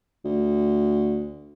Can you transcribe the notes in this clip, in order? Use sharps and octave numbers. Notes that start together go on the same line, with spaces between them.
D2